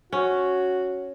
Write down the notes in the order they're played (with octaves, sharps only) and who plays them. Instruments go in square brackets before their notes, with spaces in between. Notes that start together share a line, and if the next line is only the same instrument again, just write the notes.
[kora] C#4 [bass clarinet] F#4